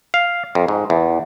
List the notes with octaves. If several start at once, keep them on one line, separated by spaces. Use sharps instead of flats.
F5
F2
G#2
E2